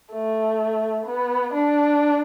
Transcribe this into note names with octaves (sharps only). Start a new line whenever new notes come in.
A3
B3
D4